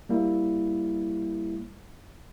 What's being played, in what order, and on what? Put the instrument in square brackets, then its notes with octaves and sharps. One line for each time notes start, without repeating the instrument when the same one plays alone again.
[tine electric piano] G3 A#3 E4